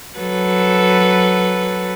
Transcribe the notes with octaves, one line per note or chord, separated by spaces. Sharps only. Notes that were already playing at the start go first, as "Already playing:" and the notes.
F#3 A4 B4